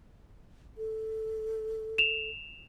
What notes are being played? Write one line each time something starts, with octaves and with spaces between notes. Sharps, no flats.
A4
E7 F7